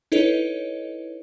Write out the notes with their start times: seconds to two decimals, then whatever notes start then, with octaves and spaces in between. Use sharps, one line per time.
0.12 D#4 E4 A4 B4 C#5 D#5